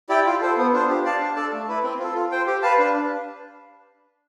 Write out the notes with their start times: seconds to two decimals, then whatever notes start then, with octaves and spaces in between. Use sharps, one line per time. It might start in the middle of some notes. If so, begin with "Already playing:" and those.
0.09 E4 G4 D5 G5
0.26 F4
0.41 A4 C5
0.57 B3
0.73 D4 F4 C5
0.89 G4
1.05 D5 F5 A5
1.20 D4
1.36 A4 D5 A5
1.52 A3
1.68 E4 B4
1.83 C4
1.99 F4 A4
2.15 F4
2.32 C5 G5
2.47 G4
2.62 B4 F5 A5
2.78 D4